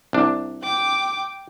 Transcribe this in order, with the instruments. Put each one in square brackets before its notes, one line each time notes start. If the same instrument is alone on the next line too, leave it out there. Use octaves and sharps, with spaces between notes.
[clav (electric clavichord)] C2 D4
[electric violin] G5 D6